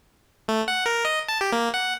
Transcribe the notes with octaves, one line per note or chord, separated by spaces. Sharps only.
A3
F#5
A#4
D#5
A5
G4
A#3
F#5